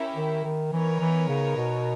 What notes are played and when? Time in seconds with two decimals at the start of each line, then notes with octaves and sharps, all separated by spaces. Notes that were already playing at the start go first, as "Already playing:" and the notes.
Already playing: C#4 E4 G4 A#4 E5
0.16 D#3
0.44 D#3
0.72 E3 B3 D#4 A#4 C#5
1.00 E3
1.28 C#3
1.56 B2